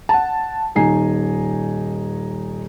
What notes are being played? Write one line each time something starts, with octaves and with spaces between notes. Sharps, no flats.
F#5 A5
D#1 D#4 G#5 C7